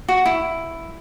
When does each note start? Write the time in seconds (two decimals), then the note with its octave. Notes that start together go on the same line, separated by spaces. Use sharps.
0.08 F#4
0.26 E4